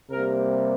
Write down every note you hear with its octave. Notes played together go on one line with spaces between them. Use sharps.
C3 G3 A#3 A#4